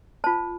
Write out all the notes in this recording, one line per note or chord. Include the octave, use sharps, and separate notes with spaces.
F4 C5 A5